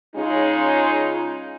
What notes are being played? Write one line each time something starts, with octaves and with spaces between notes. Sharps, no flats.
C#3 G#3 C#4 D#4 F4